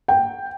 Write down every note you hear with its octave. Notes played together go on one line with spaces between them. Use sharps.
G5